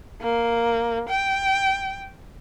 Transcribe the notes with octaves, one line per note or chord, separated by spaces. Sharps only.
A#3
G5